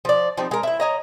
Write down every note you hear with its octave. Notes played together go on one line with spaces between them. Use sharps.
F3 D5
F3 G3 C4 D#4
G#3 A#4
E4 E5
C#5 D#5 A#5